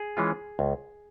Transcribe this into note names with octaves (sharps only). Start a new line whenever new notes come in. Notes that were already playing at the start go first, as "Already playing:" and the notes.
Already playing: G#4
E3 G#3 C#4 F4
C#2